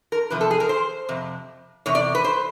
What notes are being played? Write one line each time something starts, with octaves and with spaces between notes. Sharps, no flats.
A#4
E2 C3 F3 B4
A4
G#4
A#4
C5
F2 C3
E2 C3 C#5
D5
B4
C5